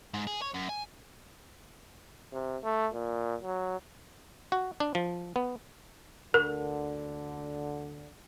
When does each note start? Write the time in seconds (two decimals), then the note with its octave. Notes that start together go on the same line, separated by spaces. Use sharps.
0.14 G#2
0.27 G#4
0.42 C#5
0.54 F#2
0.69 G#5
2.33 C3
2.63 A3
2.94 A#2
3.42 F#3
4.52 F#4
4.80 D4
4.95 F3
5.36 B3
6.34 D2 D3 A#4